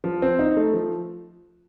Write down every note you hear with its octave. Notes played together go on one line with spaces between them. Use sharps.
F3
C4
D#4
A3
F3